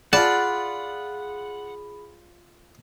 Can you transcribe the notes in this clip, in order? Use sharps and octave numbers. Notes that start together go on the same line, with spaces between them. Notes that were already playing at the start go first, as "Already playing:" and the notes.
F4 G#4 D5 F#5 A5 B5